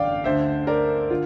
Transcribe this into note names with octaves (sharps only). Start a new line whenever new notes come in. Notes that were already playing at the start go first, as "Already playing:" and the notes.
Already playing: A1 G2 D3 D5 F5 G5
D2 D3 C5 E5
A#4 D5
D3 F4